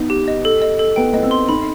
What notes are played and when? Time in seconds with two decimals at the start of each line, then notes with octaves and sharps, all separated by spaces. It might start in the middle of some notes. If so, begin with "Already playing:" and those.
Already playing: B3 D#4
0.10 G4
0.28 D#5
0.45 A4
0.62 D#5
0.79 A4
0.96 B3 G5
1.13 B3 D#5
1.23 C4
1.31 C6
1.49 D#4 B5